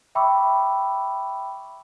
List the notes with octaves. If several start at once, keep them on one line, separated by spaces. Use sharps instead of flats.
E5 G5 B5 C#6 D6 E6